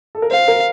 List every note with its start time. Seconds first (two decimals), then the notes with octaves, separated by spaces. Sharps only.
0.15 A4
0.22 A#4
0.31 C5 F5
0.48 A#4